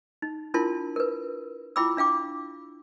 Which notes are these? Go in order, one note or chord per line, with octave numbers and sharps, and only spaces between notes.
D#4
D4 E4 F4 A#4 A5 C6
A#4 B4
E4 F4 G5 B5 D6 E6
D4 F5 G5 D6